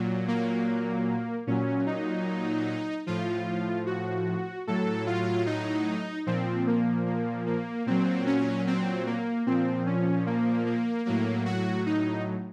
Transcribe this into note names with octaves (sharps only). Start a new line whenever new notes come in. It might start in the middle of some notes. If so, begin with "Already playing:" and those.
Already playing: A#2 F#3
A#3
A#2 F#3 C#4
D#4
A2 F3 F4
F#4
A2 F#3 A4
F4
D#4
A#2 F3 C4
A#3
A#3
A#3
A#2 F#3 C4
C#4
C4
A#3
A#2 F3 C4
C#4
A#3
A#3
A2 F#3 A#3
F#4
D#4